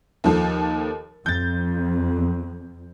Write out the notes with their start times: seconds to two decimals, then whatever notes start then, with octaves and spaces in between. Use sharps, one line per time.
0.24 D#2 F3 A4
1.26 F2 G6 A6